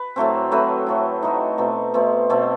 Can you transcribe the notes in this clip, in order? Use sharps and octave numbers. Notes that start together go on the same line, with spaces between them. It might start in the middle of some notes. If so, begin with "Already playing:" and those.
Already playing: B4
A2 F#3 A3 C4
A2 F#3 A3 C4 B4
A2 F#3 A3 C4
A2 F#3 A3 C4 D#4
B2 A3 C4
B2 A3 C4
B2 A3 C4